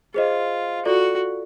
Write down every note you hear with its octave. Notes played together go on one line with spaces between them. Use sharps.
F4 G#4 C5 D#5
F4 F#4 A4 D5